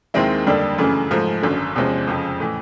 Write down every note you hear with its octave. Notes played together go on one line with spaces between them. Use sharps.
D#2 D#3 G#3 C4 E4
F2 D3 G3 A#3 D4
F#2 C#3 E3 A3
G#2 F3 A3
G#1 F#2 D3
E2 C3 F3 G#3 C#4
F2 C#3 F3
A2 E3